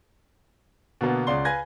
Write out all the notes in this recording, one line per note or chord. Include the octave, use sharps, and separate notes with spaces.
B2 D3 A#3 B3
C#2 C#3 D5 F#5 C6 G7
B4 F5 G#5 G#6 A#6